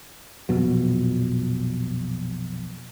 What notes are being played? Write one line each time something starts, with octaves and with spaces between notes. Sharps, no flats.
A#1 F2 B2 F#3